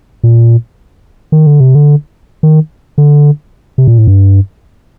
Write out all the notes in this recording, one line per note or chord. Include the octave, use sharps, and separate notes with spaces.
A#2
D#3
D3
C3
D3
D#3
D3
C3
A#2
A2
G2